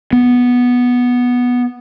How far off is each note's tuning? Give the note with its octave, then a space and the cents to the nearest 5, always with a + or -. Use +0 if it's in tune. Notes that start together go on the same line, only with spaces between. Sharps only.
B3 -5